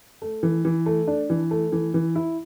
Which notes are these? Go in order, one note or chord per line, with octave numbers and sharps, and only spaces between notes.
A3
E3
E3
A3
D4
E3
A3
E3
E3
E4